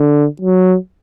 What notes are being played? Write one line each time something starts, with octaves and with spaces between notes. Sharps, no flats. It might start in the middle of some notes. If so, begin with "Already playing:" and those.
Already playing: D3
F#3